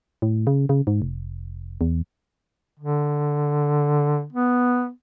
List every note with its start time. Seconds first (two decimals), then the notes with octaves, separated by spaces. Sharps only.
0.22 A2
0.47 C#3
0.69 C#3
0.87 G#2
1.02 F1
1.81 E2
2.79 D3
4.32 B3